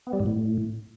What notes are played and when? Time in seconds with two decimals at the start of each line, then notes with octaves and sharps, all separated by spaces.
0.07 B3
0.13 G3
0.19 G#2
0.26 A2